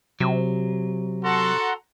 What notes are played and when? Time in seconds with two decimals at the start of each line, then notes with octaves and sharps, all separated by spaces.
0.20 C3 F#3
1.24 F#4 A4 F#5 A#5 C6